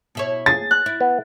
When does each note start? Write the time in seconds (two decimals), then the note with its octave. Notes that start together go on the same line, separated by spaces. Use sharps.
0.15 B2 E4 C#5
0.46 G#4 A6
0.71 F#6
0.86 E4
1.01 B3